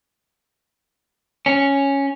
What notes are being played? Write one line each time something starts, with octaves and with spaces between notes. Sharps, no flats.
C#4